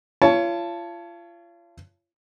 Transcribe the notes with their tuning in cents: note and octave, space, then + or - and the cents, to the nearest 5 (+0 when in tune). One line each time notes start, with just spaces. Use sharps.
F4 -35 C#5 +15 A5 +0